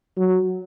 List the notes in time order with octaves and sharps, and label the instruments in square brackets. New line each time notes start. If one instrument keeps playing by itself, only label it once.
[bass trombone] F#3